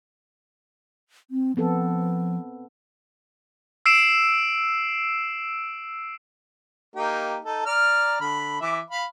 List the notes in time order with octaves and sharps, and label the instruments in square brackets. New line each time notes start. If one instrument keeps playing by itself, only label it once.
[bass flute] C4
[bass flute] F3 [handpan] B3 C4 A4
[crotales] E6 C7 D7 E7
[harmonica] A#3 D#4 G4
D#4 A4
D5 A#5 F6
D3 B5
E3 E5 D6
F5 B5